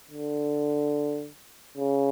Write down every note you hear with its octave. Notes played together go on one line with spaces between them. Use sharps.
D3
C#3